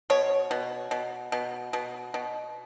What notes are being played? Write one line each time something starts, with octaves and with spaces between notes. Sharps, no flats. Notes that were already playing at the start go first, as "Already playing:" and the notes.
B2 C#5
B2
B2
B2
B2
B2